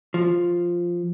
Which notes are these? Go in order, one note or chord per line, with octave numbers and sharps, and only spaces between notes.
F3